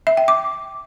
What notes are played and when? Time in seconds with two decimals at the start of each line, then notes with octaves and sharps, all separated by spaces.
0.07 E5
0.17 G5
0.28 D6